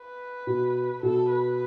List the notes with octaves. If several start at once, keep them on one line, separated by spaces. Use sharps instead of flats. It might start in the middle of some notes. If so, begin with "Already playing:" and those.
Already playing: B4
B2
B2 A4
B4